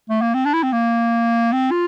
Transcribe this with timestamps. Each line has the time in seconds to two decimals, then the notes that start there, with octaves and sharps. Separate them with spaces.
0.09 A3
0.22 A#3
0.34 C4
0.45 D4
0.54 E4
0.63 C4
0.72 A#3
1.52 C4
1.71 F4